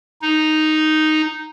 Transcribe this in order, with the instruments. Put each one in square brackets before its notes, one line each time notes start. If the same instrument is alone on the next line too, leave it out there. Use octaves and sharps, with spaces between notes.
[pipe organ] D#4